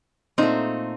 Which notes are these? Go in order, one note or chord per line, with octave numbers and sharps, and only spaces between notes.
A#2 A3 C4 D#4